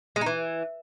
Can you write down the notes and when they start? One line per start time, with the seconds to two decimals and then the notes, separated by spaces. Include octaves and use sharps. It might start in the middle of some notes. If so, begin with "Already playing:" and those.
0.16 G#3
0.21 D#4
0.26 E3